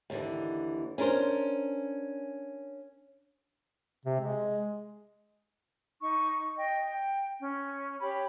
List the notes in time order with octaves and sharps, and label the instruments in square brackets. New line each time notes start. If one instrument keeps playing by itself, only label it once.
[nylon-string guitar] D#2 D3 E3
C#4 D4 A#4 C5
[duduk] C3
G#3
[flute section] D#4 C#6
D#5 G5
G5
C#4
G4 C#5 B5